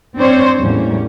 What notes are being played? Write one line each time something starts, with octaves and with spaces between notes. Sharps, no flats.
C4 D4 C5 C#5
E2 A2 G3 A#3 C#4